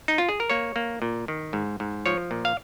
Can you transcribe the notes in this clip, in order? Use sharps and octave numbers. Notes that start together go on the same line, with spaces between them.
D#4
F4
G#4
A#4
A#3 C#5
A#3
A#2
D#3
G#2
G#2
F3 C#5
A#2
F5